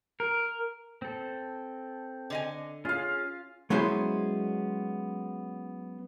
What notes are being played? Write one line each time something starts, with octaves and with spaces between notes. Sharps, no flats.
A#4
C4 A4
D3 D#5 G#5
C#4 F4 G#4 F5
F#3 G#3 B3 C#4 E4 C5